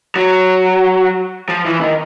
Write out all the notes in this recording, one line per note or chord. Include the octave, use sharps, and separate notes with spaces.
F#3
F3
E3
D#3